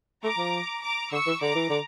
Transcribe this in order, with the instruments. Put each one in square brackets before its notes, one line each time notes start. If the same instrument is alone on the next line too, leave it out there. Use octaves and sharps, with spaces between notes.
[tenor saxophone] A3 [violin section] A#5 D6
[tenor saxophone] F3
[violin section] A#5 D6
[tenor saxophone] D3 [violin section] C#6 E6
[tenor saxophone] E3
[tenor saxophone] D3 [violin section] A#5 D6
[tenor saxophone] E3
D3